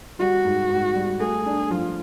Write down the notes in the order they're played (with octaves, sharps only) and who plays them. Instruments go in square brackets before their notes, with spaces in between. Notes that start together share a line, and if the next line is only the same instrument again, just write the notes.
[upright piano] G3 [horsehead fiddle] F#4
[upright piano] G#2
G#2
G3
[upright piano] A3 [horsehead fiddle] G#4
[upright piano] D4
[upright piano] F3 [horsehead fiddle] F4